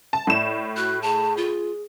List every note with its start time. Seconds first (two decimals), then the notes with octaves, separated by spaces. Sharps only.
0.13 A5
0.27 A2 D5 E7
0.77 F#4 F#6
1.02 G#4 A5
1.37 F4